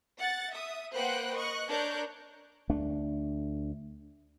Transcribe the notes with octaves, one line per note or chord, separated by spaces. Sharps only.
F#5 A6
E5 D#6
A#3 B4 C5 F#5 G5 F#6
D#5 C#6 F#6
D4 A#4 C#5 F#6 G6
D2 A3 D4